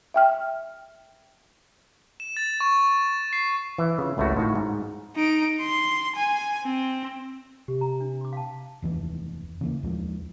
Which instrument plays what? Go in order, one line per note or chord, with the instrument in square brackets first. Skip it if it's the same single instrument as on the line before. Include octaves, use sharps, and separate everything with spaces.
[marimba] E5 G5 F6
[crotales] E7
A6
C#6
C7
[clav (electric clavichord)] E3
C#3 F4
G#1 C#2 A3 E4 F#4
A2 D#3 F4 F#4
G#2
[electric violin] D#4 D7
C6
G#5
C4
[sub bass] C3 [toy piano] G4
[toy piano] A#5
D4
C6 D6
F5 G5 A5
[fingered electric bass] F1 D#2 E3
C#3 E3 F#3 A#3
D#2 F3 G#3